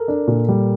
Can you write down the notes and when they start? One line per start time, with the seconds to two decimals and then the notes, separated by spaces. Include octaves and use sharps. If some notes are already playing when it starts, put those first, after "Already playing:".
Already playing: A4 A#4
0.08 D4
0.28 A#2
0.48 G3